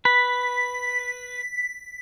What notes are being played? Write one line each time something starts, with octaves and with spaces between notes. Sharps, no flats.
B4 B6